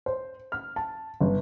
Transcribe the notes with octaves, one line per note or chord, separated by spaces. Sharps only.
C5
F6
A5
G1